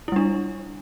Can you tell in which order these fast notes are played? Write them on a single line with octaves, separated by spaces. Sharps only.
E4 G3 D4